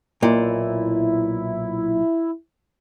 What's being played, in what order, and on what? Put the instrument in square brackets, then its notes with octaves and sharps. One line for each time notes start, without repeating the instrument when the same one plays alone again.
[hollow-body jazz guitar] B1 A#2 [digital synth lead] E4